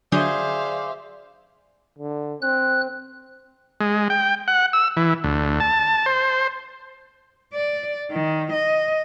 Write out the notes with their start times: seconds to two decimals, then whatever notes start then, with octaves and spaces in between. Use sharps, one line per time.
0.12 D3 F#3 G#4 C5 D5 E5 F5 G6
1.99 D3
2.42 C4 F#6
3.81 G#3
4.10 G5
4.48 F#5
4.73 E6
4.97 E3
5.24 D2
5.60 A5
6.06 C5
7.54 D5
8.11 D#3
8.53 D#5